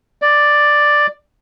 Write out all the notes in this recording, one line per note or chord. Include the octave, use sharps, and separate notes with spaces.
D5